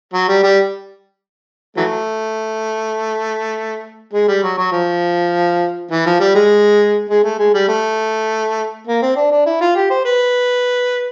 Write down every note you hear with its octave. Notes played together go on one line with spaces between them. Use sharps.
F#3
G3
G3
E3 F#3 A3
G#3
G3
F#3
F#3
F3
E3
F3
G3
G#3
G#3
A3
G#3
G3
A3
A#3
C4
D4
D4
E4
F4
G4
C5
B4